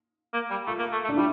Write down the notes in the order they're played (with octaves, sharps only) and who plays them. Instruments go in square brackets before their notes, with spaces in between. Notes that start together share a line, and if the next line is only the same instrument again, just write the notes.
[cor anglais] A#3
G3
[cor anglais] A3 [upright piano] F4
[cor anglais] A#3
A3
A3
[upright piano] D4
[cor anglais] G3 [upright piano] E4